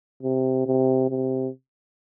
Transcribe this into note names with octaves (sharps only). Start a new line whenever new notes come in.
C3
C3
C3